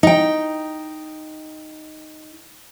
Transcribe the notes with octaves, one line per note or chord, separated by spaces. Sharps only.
D#4 G5